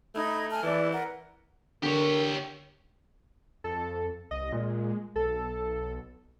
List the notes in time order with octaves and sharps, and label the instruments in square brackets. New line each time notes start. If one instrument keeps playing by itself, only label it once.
[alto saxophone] A3 [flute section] D#4 B5 G#6
[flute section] G#5 A5 F6
[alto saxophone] E3 [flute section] E4 D5
[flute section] A#4 B4 F#5
[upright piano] D3 [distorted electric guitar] G4 C#5 [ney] A#4
[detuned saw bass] F2 [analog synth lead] A4
[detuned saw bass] C2 [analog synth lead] D#5
[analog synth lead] A#2 [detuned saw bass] G#3
[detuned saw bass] B1 [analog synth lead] A4